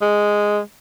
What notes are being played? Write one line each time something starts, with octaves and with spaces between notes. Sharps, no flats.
G#3